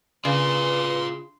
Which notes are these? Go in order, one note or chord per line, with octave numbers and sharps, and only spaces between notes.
C#3 F4 B4 D5 C6